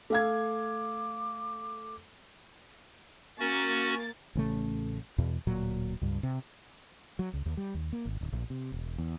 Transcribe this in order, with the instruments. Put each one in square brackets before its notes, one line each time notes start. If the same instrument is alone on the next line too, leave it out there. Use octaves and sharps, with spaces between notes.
[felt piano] A3 F5 G#6 [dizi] D6
[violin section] A#3 A6 [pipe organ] C#4 F#4
[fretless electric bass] A1 C#3 A3
E2 B2
D1 A#2 F#3
C#2 G2
C3
F#3
C#2
D#2
G3
D#2
A#3
G#1
D1
A#1
C3
E1
E2